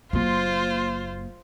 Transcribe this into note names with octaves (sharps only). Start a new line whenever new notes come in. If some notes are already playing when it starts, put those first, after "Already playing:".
F#1 A#3 F4 C5